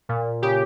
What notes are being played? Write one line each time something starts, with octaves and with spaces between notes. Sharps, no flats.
A#2
C#3 G4